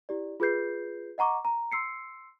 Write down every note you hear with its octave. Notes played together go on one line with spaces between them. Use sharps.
E4 G4 D5
F4 G#4 B4 G6 C7
D#5 F#5 A#5 C#6 D6
A#5
C6 E6 C7 C#7